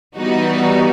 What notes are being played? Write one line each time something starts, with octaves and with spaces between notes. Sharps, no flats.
E3 G3 B3 D#4 F#4